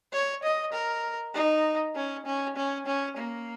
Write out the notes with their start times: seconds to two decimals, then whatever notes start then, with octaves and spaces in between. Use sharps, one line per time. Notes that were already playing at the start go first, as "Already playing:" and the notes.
0.13 C#5
0.43 D#5
0.73 A#4
1.34 D#4
1.95 C#4
2.26 C#4
2.56 C#4
2.87 C#4
3.16 A#3